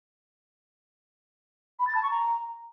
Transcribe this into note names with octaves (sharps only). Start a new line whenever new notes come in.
B5
A6
A5
C#6
A#5